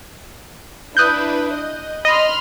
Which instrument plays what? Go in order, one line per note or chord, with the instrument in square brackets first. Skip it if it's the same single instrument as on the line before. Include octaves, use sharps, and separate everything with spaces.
[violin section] D4 E4 B4 [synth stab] D#6 F#6 G6
[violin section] D#5
[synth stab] D#5 [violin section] B5 C6 F6